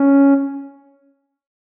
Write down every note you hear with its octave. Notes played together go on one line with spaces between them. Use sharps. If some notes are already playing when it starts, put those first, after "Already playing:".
Already playing: C#4